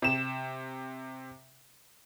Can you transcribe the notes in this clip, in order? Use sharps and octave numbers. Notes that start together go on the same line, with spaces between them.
C3 E7